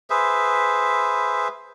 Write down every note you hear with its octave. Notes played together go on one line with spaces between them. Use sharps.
G#4 B4 C5 E5